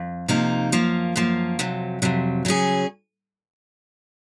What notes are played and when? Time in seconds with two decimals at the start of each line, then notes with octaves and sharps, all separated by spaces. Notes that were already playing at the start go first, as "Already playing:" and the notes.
Already playing: F2
0.28 F2 C3 F3 A#3 D#4
0.72 F#2 F3 A#3
1.16 F#2 F3 A#3
1.59 F2 C3 F#3
2.02 F2 C3 F#3
2.45 C#3 F#3 C#4 G#4